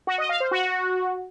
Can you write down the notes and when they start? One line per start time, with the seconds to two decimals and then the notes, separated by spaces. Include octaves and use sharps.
0.07 F#4
0.18 D#5
0.29 F5
0.40 C5
0.51 F#4